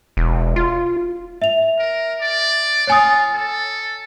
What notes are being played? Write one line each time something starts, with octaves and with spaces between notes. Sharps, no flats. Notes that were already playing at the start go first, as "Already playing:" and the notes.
E1
F4
E5 F7
A#4
D5
F4 C#5 G#5 D#6
A4